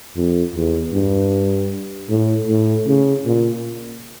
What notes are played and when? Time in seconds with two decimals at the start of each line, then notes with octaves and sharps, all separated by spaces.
0.16 F2
0.55 E2
0.94 G2
2.09 A2
2.48 A2
2.87 C#3
3.25 A#2